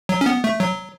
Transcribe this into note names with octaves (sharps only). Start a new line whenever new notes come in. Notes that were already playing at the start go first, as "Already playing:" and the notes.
F#3
C#4
B3
A3
F#3